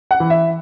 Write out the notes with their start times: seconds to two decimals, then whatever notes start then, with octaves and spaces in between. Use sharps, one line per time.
0.11 F#5
0.20 E3
0.30 E5